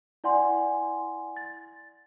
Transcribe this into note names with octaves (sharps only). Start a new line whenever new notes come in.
E4 D5 F#5 G#5 C6
A6